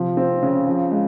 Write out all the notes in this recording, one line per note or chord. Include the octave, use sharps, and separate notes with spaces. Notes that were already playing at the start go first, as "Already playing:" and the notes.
Already playing: C3 F3
C4
C#3
F3
G#3